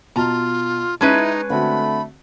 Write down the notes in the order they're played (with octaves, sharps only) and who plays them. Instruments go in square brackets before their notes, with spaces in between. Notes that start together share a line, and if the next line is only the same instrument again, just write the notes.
[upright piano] B2 A5 [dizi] F4 [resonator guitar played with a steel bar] A#5
[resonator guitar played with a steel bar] G#3 C#4 B4 [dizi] D#4 [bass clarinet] E4 [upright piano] A5
[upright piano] D3 C4 F#4 [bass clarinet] A3 [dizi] B5